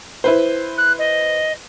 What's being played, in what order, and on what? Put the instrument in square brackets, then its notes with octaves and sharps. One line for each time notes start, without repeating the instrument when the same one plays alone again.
[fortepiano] E4 B4 C5
[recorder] F#6
D#5